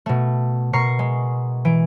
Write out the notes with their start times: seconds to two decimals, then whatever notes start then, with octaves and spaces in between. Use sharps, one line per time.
0.06 B2 A3
0.73 B2 A#4 A#5 C#6 C7 C#7
0.99 G#3
1.65 E3 D7